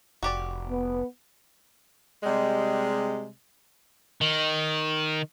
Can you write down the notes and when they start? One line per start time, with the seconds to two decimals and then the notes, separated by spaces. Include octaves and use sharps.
0.23 F1 F#4 G4 D5
0.68 B3
2.23 C3 G3 G#3
4.21 D#3